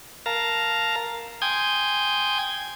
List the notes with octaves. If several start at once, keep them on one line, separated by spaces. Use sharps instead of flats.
A#4 F5 A5 A#5
G5 G#5 C6 D#6 G6 G#6